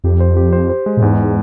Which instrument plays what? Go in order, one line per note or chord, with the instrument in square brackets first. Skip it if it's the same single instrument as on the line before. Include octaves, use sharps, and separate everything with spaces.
[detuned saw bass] F2 [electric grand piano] G4
[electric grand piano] C5
G4
C5
C5
G#3
[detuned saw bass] A#2
[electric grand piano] E2 [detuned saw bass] G#2